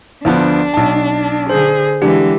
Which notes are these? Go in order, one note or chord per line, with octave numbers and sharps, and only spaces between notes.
D2 F3 B3 D4
B1 A5
D3 G#4 C5
D3 E3 G#3 G4